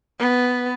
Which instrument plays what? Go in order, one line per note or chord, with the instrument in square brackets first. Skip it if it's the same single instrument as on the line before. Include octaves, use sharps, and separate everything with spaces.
[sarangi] B3